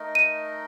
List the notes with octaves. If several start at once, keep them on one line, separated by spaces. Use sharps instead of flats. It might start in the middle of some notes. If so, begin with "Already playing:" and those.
Already playing: A3 D#4 A#4 D#5
D#7